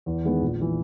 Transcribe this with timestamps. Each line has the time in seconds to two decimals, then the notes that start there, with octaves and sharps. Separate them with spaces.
0.06 E2
0.24 D#3 G#3 B3
0.42 A#1
0.61 E3